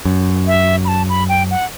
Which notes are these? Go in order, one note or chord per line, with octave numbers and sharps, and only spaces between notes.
F#2
E5
B5
A5
B5
G5
F#5